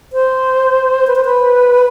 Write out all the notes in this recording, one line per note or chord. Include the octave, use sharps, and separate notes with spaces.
C5
B4
C5
B4